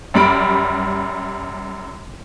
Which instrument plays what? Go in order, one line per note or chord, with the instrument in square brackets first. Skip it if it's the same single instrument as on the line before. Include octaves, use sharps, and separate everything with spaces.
[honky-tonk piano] F#2 G3 B5 D7